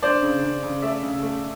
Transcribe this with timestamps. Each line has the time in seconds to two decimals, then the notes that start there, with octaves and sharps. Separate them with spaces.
0.02 D4 C5 D5
0.22 C#3
0.43 C#3
0.63 C#3
0.82 A3 D5 E5
1.03 C#3
1.23 A3